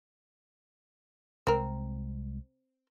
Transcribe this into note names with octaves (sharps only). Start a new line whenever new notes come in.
C2 G#3 C4 A#4